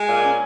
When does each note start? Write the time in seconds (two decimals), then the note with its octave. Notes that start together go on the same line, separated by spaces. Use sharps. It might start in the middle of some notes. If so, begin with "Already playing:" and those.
Already playing: G#3 G#5
0.09 A#2
0.24 C#4